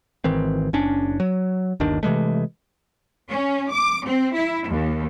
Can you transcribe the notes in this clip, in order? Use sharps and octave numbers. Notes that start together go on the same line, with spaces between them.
G#1 D#3 E3 C4
F#1 C#4 D4
F#3
G1 D#2 D#3 D4
C3 E3 G#3 A3
C#4
D6
C4
E4
D#2